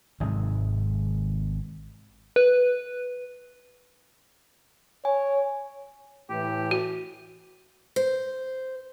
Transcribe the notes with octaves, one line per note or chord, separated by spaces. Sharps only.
G#1 G#2 C3 D#3
B4
C#5 G#5
A2 E3 G4
F#4
C5